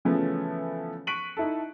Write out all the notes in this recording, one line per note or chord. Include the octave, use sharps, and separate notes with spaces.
C#3 E3 F3 A3 B3 C#4
C#6 F#6 B6 D7 D#7 F#7
D#4 E4 A4